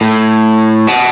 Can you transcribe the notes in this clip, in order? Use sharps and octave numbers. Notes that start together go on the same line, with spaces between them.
A2
B2